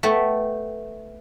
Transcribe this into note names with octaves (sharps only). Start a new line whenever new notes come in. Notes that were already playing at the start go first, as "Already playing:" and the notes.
A3 B3 E5 G5